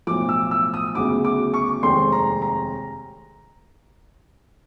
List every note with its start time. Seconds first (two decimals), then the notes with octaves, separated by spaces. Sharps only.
0.07 B1 A2 F3 D6
0.29 E6
0.51 E6
0.74 D#6
0.95 D2 C#3 F#3 B3 D6
1.24 D6
1.54 C#6
1.83 F1 D#2 D#3 G#3 C4 C6
2.12 A#5
2.42 A#5